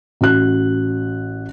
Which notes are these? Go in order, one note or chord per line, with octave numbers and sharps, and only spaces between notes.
A1 F#4 F#6